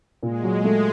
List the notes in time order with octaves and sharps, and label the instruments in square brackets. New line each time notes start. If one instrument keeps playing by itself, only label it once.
[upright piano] A#2 [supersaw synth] G#3
[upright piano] F#3
A3